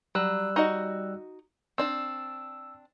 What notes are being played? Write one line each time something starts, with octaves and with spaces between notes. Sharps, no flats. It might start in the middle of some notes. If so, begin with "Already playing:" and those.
F#3 G3 E6 F#6
D#4 F#4 D#5
C4 D4 D5 E6